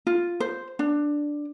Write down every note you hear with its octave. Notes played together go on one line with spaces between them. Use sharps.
F4
C5
D4